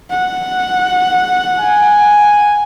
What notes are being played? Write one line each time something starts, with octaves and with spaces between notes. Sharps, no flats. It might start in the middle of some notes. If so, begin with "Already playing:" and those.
F#5
G#5